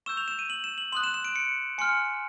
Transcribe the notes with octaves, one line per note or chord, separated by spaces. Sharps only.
C#6 E6 G6 E7
F7
E7
D#7
F#7
E7
F#7
C6 D#6 F#6 F#7
E7
E7
D7
C#7
G#5 C6 F6 C#7